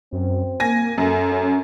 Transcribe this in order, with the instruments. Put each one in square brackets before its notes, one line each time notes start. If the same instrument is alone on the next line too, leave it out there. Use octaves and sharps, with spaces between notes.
[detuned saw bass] F#2 [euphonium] C4
[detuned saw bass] A#3 [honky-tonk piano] G#5 A#6
[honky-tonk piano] F#2 [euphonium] A4
[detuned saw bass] C#4